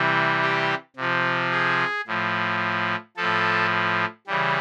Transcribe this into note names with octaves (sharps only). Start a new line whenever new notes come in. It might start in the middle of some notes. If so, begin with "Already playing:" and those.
Already playing: C3 E3 G3
G4
C3 F3
G#4
A2 F3
A2 F3 A4
C#3 E3 G3